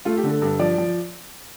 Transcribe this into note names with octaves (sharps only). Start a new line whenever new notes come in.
A3 F4
G4
D3
A4
G2 A4
F3 D5
F3